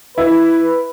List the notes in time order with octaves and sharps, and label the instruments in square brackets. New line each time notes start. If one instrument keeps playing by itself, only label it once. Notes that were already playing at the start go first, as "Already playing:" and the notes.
[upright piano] E4 [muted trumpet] B4